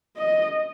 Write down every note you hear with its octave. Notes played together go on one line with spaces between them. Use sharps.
D#5